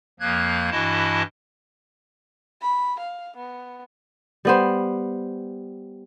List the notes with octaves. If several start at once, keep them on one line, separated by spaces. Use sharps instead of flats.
F2 F3 A#3 F#6 G#6
G2 E3 E4 F#4 D#5 A5
B5
F5
B3
G3 B3 C5